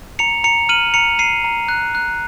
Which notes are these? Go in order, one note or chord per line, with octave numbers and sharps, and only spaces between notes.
A#5 C#7 F7
A#5 C#7 F7
F6 D#7 F#7
A#5 C#7 F7
A#5 C7 D#7
A#5
F#6
F#6